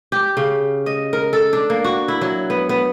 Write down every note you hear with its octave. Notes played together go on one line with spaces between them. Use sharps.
G4
C#3
D#5
A#4
A4
D4
A#3
F#4
E4
F#3
B3
B3